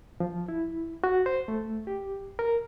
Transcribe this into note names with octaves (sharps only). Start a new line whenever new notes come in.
F3
E4
F#4
C5
A3
G4
A#4